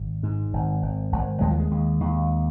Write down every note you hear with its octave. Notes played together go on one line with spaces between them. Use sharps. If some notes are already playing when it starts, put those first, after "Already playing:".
Already playing: G#1
G#2
G#1
G#1
G#1
D#2 G#3
F3
G#3
D#2
D#2